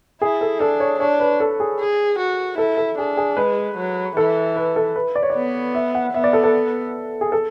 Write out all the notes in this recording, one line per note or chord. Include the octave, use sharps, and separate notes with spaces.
E4 G#4
A4
D4 A4
C#5
D4 C#5
B4
A4
G#4
G#4
F#4
E4 A4
A4
D4 G#4
G#4
G#3 B4
F#3
E3 A4
B4
A4
B4
D5
C#5
B3 D5
E5
F#5
B3 E5
D5
A4
A4
G#4
A4